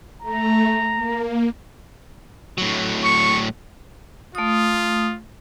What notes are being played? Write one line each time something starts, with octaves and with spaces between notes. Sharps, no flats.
A3 A#5
A#3
A2 F#3
C#6
A3 F4 D#6